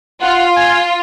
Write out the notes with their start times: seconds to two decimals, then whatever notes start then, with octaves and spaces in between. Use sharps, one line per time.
0.22 F4 F#5
0.57 G#5